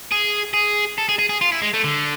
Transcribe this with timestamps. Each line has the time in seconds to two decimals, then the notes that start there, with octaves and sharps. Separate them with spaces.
0.11 G#4
0.54 G#4
0.98 A4
1.09 G#4
1.19 G#4
1.29 G#4
1.41 F4
1.52 E4
1.62 G#3
1.74 A3
1.84 D3